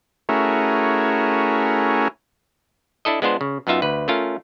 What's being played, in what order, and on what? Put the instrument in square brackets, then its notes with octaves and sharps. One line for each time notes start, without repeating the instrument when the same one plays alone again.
[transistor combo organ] A3 C#4 E4 F#4 G#4 A#4
[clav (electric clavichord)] D4 E4 A4 D#5
G#3 B3 D4 F4 C5
C#3
F#2 B3 D#4 F4 E5
D2 B4
A3 C#4 F4 A#4